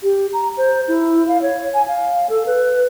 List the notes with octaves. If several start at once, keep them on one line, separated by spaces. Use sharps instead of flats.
G4
A#5
C5
E4
F5
C#5
G#5
F5
A4
B4